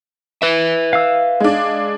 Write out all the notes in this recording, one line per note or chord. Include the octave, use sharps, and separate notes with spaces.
B4 E5
F5 E6
G#3 D4